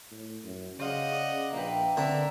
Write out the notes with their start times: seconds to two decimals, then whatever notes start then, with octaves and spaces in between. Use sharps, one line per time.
0.11 A2
0.44 F#2
0.79 C#3 C5 D5 D#5 F5 F#5
1.12 D5
1.53 A#1 A#3 B4 E5 G5
1.97 D3 C4 A#4 E5 A#5